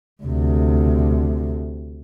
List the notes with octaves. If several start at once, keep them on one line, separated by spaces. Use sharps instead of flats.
D2 C3